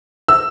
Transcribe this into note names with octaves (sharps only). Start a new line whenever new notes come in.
E6